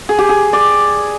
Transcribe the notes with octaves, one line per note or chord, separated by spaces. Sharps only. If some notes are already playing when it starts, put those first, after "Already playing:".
G#4
G4
G#4
D5